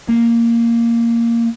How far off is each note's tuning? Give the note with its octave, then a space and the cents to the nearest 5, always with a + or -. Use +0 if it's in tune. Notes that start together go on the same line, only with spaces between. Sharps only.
A#3 -5